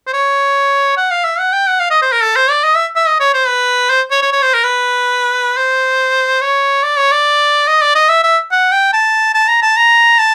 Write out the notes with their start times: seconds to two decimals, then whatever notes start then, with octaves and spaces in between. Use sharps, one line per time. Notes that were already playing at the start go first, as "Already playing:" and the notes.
0.07 C5
0.13 C#5
0.97 F#5
1.11 F5
1.24 E5
1.39 F#5
1.52 G5
1.67 F#5
1.80 F5
1.90 D#5
2.02 C5
2.12 A#4
2.22 A4
2.36 C5
2.50 D5
2.64 D#5
2.75 E5
2.96 E5
3.07 D#5
3.20 C#5
3.34 C5
3.48 B4
3.90 C5
4.11 C#5
4.22 C#5
4.32 C#5
4.42 C5
4.54 A#4
4.64 B4
5.57 C5
6.41 C#5
6.83 D5
6.97 C#5
7.12 D5
7.68 D#5
7.82 D5
7.95 D#5
8.09 E5
8.24 E5
8.51 F#5
8.72 G5
8.93 A5
9.34 A5
9.48 A#5
9.62 A5
9.77 A#5
10.19 A5